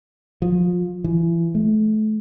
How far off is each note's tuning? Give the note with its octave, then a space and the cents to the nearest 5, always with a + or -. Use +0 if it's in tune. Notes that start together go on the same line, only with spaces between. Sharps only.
F3 +25
E3 +30
A3 -30